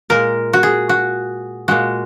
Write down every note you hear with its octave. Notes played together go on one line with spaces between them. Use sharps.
A#2 G#3 A#4
F#4
G#4
F#4
A#2 G#3 F#4